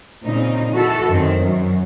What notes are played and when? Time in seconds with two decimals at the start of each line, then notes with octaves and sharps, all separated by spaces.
0.24 A#2 C#3 C4 D#4
0.73 E3 F#4 A4
1.09 F#2 D#3 C4
1.39 F#2